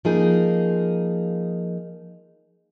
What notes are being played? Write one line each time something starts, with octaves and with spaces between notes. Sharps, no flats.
F3 A#3 D#4 G#4